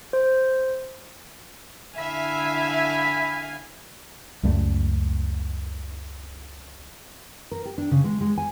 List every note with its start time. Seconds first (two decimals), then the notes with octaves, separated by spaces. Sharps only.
0.13 C5
1.98 D3 E4 E5 F5 G#5 B5
4.43 C#2 F#2 G3 A3
7.51 A#4
7.65 G4
7.78 D4
7.91 C#3
8.04 G#3
8.21 G#3
8.38 G#5